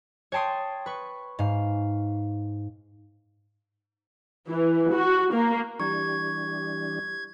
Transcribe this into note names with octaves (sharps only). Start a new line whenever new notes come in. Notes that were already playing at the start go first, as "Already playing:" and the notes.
C#5 G5 A5 C6 D#6
B4 C#6
G#2 F5
E3
F#4
A#3
E3 G3 D4 G4 C#6 G#6